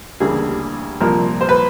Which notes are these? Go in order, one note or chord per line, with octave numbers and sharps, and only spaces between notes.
D2 C#3 E3 G3 A#3 G#4
C2 A#2 F3 A#4
C5
B4